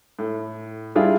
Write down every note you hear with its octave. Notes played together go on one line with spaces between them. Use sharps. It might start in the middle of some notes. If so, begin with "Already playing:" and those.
A2
G3 D4 E4 F4 G#4